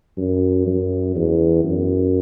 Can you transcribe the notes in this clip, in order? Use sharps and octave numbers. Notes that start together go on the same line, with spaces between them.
F#2
F#2
E2
F#2